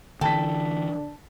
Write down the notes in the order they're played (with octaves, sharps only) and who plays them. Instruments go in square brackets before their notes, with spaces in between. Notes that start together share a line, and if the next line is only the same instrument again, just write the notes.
[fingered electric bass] D3 E3 [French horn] D4 [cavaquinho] A4 [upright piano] G5 A5 B6